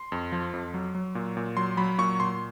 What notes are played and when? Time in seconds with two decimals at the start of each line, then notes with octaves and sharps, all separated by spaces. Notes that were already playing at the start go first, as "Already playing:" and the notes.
Already playing: C6
0.12 F2
0.32 F3
0.54 F2
0.74 F#3
0.95 F#3
1.15 A#2
1.37 A#2
1.57 F#3 C6
1.77 F#3 B5
1.98 A#2 C#6
2.20 A#2 C6